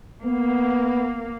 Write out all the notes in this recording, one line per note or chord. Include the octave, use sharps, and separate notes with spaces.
A#3 B3